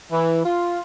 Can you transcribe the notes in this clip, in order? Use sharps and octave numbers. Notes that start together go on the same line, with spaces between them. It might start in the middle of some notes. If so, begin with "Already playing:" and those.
E3
F4